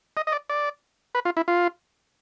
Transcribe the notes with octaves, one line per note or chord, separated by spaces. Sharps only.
D#5
D#5
D5
D5
B4
F4
E4
F4